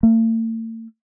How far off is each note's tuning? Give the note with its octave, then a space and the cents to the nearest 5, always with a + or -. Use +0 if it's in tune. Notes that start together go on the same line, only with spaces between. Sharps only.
A3 +45